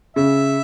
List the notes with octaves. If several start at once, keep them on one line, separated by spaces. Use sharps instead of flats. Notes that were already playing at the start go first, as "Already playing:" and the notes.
C#3 E5